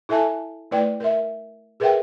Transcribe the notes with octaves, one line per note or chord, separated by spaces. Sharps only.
E4 A4 E5 G#5 A5
A3 E4 B4 D5 G5
A#4 E5
G#4 A#4 B4 E5 F#5 G5